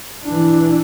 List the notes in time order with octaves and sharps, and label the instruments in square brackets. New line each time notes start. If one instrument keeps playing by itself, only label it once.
[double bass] E3 D4